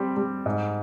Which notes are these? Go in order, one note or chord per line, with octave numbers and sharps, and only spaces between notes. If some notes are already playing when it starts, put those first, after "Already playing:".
Already playing: G3 C4
G3
G#2